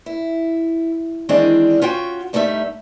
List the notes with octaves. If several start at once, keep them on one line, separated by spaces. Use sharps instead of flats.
E4
D#3 E3 G#3 C4 D4 G#4
C#4 F4 F#4 G5
G2 G3 A3 D#4 A#4 E5